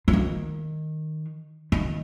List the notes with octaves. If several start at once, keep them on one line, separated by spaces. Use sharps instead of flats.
F3
D#3
D#3